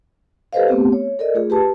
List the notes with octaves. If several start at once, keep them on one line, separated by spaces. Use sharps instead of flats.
G4 A4 B4 C5 D#5 F5
A3 B3 C4 G4
C#5
A4 A#4 D5 D#5
A3 F4 G#4
G4 B4 A5